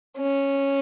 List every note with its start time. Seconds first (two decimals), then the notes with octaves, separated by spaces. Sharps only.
0.18 C#4